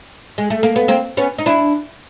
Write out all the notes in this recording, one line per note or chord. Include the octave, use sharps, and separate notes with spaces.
G#3
A3
A#3
B3
A#3 C4
B3 C#4
D#4
D4 E4